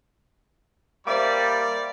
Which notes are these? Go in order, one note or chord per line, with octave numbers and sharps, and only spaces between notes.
G3 A#3 C5 D5 E5 D6